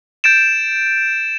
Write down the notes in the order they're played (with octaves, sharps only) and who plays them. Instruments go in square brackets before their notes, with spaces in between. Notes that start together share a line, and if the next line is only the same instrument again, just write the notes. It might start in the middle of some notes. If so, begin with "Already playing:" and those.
[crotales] G6 A6 D7 E7